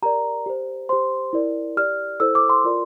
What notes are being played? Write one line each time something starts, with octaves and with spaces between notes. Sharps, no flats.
G4 A#4 D5 A#5
G4 C5
G4 C5 C6
E4 A#4 D5
G4 D5 F6
E4 A4 C5 E6
D6
C6
F4 A#4 D5